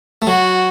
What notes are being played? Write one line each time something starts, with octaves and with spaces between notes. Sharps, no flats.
A3
F#3 F#4